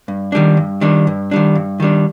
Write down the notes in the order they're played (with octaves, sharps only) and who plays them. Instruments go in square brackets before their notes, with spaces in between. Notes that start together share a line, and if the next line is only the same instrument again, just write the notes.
[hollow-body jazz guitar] G2
D#3 G3 D4
G2
D#3 G3 D4
G2
D#3 G3 D4
G2
D#3 G3 D4